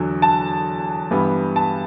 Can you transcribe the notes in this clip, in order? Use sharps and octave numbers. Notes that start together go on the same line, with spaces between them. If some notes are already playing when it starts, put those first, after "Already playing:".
Already playing: E2 D3 F#3
A5
G2 E3 G3 B3
A5